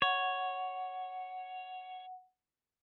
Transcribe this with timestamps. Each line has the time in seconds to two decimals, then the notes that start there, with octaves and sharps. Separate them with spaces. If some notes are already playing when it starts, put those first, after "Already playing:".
0.02 C#5 F#5